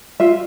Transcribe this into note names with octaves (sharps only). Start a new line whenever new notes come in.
F4 E5